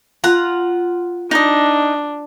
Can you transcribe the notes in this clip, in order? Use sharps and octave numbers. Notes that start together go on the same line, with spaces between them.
F4 F#5 A#5
D4 D#4 D#5